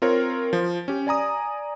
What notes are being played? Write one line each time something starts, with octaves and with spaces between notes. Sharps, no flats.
C4 F4 A#4 C#5
F3
C#4 G4
D5 G#5 A#5 D#6